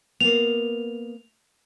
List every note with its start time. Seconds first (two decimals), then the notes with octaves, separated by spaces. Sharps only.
0.20 A#3 B3 F7